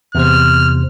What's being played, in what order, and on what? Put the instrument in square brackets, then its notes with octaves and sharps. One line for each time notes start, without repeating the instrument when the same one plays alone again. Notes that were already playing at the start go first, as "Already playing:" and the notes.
[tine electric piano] E2 C3 C5 [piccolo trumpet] F6